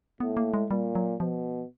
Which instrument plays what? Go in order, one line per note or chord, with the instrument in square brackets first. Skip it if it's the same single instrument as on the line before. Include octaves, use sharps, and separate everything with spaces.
[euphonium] A2 [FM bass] B3
[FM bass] A#3
G#3
[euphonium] A#2 [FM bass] G3
[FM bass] F#3
[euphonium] B2 [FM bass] F3